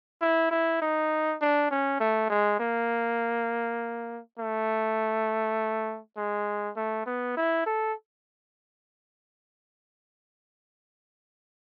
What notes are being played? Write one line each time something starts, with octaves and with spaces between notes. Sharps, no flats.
E4
E4
D#4
D4
C#4
A3
G#3
A#3
A3
G#3
A3
B3
E4
A4